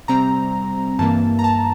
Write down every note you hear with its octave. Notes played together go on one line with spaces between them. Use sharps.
C3 G3 C4 A#5
G2 E3 A#3 A5
A#5
A5